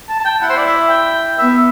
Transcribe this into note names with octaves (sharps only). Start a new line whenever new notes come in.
A5
A5
G5
E4 F#5
C5
D5
E5
G5
B3 E5